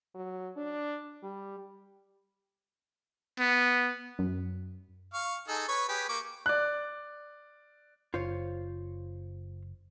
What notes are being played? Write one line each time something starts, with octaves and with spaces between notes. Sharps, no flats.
F#3
D4
G3
B3
F#2
F5 C#6
D#4 G#4 A4
B4 C#5 C#6
G4 G#4 B4
A#3 C#6 D6
D5 F#6
F#1 F4 C5 C#5